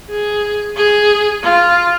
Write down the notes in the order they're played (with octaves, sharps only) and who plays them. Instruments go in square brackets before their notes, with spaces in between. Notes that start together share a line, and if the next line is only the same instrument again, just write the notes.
[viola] G#4
G#4
F4